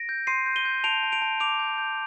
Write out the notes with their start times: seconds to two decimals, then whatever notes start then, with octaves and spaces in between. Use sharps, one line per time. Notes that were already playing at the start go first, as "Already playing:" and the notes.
Already playing: A#6 D7
0.09 G6
0.27 C6 C7 D#7
0.46 G6
0.56 D#7 G7
0.65 G6
0.84 A5 D7 F7
1.03 A5
1.12 D7 F7
1.22 A5
1.40 D6 D7 F7
1.59 G6
1.78 G6